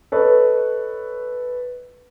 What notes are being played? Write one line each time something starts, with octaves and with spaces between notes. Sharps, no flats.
A4 B4 C#5 D#5